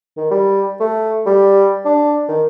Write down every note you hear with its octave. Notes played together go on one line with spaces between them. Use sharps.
D#3
G3
A3
G3
D4
D#3